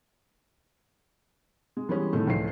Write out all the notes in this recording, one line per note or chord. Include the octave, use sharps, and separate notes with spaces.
G#3
E3 G3 G#3 B3 C#4
A2 D#3 A3
C#2 A2 F3 C#4 C7